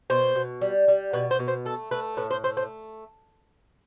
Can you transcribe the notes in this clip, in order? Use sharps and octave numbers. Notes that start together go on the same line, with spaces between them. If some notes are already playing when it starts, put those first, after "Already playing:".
B2 C5
B2
G3
G3
B2 B4
C5
B2
C5
A3 A4
A3 B4
A2 B4
C5
A3 C5
C5